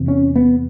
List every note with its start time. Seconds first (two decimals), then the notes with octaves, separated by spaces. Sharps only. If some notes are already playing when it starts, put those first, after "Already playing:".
Already playing: E2 C3
0.08 C#4
0.36 B3